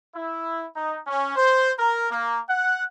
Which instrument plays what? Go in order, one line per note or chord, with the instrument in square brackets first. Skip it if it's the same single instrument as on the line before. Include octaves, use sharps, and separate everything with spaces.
[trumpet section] E4
D#4
C#4
C5
A#4
A#3
F#5